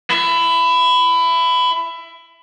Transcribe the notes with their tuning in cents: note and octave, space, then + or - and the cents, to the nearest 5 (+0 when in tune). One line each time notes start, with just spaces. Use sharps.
E4 +20